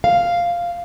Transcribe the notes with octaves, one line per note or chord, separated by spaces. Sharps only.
F5